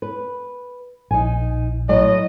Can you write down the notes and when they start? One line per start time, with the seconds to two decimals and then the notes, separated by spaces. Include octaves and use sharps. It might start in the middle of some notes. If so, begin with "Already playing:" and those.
0.02 B4
1.11 A#1 D#4 G#5
1.89 A2 F#3 D#5